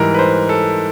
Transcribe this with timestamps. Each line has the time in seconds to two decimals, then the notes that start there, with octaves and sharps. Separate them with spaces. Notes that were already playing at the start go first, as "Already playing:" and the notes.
Already playing: G#2 E3 G3 A#4
0.14 B4
0.19 C5
0.49 A4